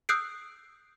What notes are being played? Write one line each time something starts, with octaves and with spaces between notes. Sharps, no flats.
D#6 E6 F#6 G6 C7 D7